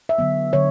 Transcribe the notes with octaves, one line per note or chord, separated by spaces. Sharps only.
E5
D3 F#3 B3
D3 F#3 C#5